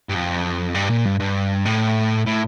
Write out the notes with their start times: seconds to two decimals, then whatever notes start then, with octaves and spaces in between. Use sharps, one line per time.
0.09 G2
0.15 F2
0.75 G2
0.90 A#2
1.05 G2
1.20 G2
1.65 A2
2.26 A2